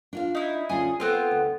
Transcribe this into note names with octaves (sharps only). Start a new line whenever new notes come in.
D4 F4 F5
D#4 E4
D2 C#4 F4 G#4
B3 C4 F4 A4 C5
D2